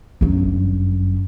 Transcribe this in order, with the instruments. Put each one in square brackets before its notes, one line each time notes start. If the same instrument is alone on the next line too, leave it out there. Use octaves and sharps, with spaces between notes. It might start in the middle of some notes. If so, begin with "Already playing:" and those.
[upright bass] G1 F#2